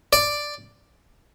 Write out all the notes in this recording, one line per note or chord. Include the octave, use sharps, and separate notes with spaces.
D5